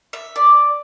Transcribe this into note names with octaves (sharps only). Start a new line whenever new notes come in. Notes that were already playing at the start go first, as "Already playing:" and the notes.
E5
D5